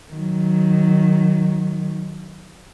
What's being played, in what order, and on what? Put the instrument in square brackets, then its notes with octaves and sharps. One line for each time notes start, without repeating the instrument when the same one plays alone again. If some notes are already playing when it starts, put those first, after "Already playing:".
[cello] D#3 F#3